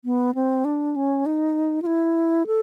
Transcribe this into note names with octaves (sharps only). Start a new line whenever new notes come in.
B3
C4
D4
C#4
D#4
F4
E4
A4